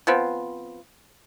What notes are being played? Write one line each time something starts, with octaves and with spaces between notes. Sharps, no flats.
F3 B3 C4